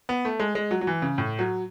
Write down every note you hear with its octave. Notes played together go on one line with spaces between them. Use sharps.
B3
A3
G#3
G#3
F#3
F#3
E3
C#3
A2
F#3